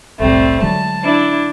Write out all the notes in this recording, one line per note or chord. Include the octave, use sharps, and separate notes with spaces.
F#1 C2 A2 G3 A3 C4
D3 F#3 G#3 A5
D4 E4